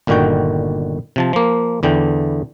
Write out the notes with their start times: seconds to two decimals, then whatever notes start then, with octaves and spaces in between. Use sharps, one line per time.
0.07 G1 A#2 D3 D#3 F#4 G5
1.16 C3 F3 A5
1.33 F3 A#3
1.83 E2 D3 E3 G5